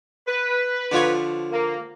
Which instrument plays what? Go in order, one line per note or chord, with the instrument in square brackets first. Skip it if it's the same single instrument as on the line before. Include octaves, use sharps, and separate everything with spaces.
[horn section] B4
[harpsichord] D3 F3 C#5
[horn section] A#3